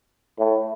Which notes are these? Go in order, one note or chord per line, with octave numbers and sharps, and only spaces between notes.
A2